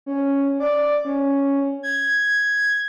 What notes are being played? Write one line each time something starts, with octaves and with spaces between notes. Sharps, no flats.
C#4
D5
C#4
G#6